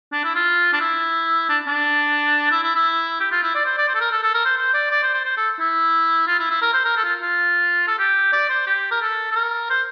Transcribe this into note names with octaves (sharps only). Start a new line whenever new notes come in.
D4
E4
F4
D4
E4
D4
D4
E4
E4
E4
G4
F4
E4
D5
C5
D5
C5
A4
A#4
A4
A4
A#4
C5
C5
D5
D5
C5
C5
C5
A4
E4
F4
E4
E4
A#4
C5
A#4
A4
F4
F4
A4
G4
D5
C5
G4
A#4
A4
A4
A#4
C5